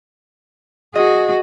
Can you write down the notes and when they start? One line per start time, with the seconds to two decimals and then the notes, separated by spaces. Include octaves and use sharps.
0.95 F#4 G#4 D#5